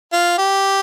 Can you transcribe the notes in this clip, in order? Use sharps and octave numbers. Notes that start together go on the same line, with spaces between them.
F4
G4